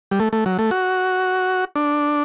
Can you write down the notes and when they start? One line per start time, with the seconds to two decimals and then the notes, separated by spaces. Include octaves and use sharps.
0.11 G3
0.20 A3
0.33 A3
0.46 F#3
0.59 A3
0.71 F#4
1.76 D4